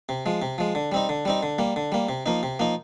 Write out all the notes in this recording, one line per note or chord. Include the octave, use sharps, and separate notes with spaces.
C3
F3 G#3
C3
F3 G#3
D3
G3 C4 D#4
D3
G3 C4 D#4
D3
G3 A#3
D3
G3 A#3
C3
F3 A#3 D#4
C3
F3 A#3 D#4